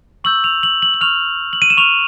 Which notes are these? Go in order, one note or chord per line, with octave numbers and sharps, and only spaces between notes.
C#6 E6 G6 F#7
F7
F#7
F#7
F#7
C#6 F6 F7
F#7
D#7
E7
C#6 F6 F7